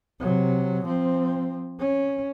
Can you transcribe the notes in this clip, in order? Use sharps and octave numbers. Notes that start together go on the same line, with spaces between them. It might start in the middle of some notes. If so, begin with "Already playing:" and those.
C3 F#3
F3 C4
C#4